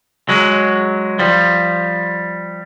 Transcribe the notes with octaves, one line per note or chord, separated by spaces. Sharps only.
F#3 G#3
F3 G3